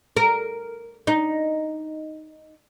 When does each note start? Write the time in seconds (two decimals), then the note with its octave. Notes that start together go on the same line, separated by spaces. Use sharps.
0.16 A#4
1.07 D#4